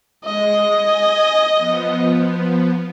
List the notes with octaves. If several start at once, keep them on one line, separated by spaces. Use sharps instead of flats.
G#3 D#5
G#5
F3 B3